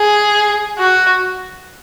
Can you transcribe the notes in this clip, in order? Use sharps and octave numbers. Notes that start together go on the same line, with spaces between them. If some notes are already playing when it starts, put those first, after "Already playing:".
Already playing: G#4
F#4